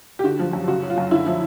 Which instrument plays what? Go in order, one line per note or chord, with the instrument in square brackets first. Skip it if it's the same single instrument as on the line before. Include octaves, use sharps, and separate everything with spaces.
[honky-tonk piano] G4
D3 F#4
F3
F#2
C#3 F#4
F#3
F4
F#2
D3 E4
F3